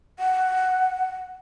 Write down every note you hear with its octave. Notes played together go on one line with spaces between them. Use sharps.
F#5